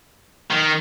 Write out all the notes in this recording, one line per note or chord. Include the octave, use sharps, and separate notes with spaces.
D#3